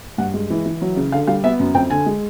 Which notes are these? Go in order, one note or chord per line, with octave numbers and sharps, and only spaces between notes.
G2 F#5
G#3
E3
E3
F#3
C#3
D3 F5
G3 F5
B3 E5
F#2
F2 G5
D3 G#5
G#3